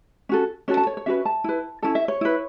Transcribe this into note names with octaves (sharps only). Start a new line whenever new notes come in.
C#4 F#4 A4
C#4 F#4 A4 C#5
A5
C#5
C#5
C#4 F#4 B4 E5
A5
E4 B4
C#4 E4 A4 A5
E5
C#5
E4 B4